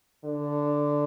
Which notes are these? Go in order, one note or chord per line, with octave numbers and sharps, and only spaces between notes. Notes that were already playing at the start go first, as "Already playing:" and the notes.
D3